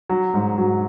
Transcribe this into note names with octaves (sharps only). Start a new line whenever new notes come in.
F#3
G#2
F#3